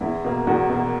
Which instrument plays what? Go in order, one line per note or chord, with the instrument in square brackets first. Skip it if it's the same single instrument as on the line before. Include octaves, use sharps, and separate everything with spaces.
[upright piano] E2 E4
B2 A#3
E2 F#4
B2 A#3